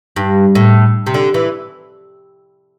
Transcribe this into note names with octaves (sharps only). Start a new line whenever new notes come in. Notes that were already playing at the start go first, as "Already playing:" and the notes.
G2
A2
C3
D3
E3